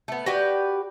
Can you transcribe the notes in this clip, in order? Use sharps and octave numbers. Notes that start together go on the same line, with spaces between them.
A3 B3
F#4 G4 B4 D5